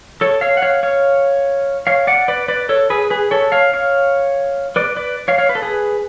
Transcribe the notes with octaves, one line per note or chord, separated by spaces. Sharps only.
A4 C#5
C#5 F5
F#5
C#5 F5
C#5 F5
C#5 F5
D5 F#5
B4 D5
B4 D5
A4 C#5
G#4 B4
G#4 B4
A4 C#5
C#5 F5
C#5 F5
B4 D5
B4 D5
C#5 F5
C#5 F5
B4
A4
G#4 B4